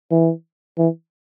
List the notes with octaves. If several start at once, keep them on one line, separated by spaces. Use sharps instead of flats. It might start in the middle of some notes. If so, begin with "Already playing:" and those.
E3
E3